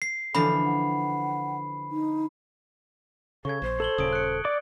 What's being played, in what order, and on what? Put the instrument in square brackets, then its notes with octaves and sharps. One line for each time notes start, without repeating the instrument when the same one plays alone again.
[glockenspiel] C7
[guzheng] D3 E3 F3 [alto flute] A4 [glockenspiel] B5
[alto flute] F#5
D#4
[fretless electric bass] C#3 [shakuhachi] A4 [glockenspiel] C#6 G#6
[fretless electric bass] A#1 [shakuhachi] C5
[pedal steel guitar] A4 [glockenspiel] G#6 F#7 G7
[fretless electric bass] D#1 C#3 [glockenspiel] D#6 D7
[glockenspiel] F#6 C#7
[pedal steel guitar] D5 D6